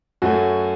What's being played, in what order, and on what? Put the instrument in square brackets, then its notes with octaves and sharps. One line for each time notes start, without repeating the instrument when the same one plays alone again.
[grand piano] F#2 F#3 A3 F#4